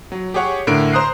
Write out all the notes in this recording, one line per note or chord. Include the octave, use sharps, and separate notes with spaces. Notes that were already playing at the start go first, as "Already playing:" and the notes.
F#3
G4 G#4 C#5 F#5
A2 D3 A#4 D7
C5 A#5 D#6 F#6 C7